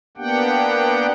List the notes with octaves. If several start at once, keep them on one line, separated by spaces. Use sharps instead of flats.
A#3 B3 D4 G4 F#5 G5